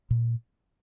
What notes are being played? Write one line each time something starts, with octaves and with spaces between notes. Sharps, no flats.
A#2